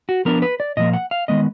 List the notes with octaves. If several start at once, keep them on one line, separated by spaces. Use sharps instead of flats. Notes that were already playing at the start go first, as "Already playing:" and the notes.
F#4
F3 B3 D4 A#4
B4
D5
A#2 F3 A#3 D#5
F#5
F5
D#3 G#3 B3 D#5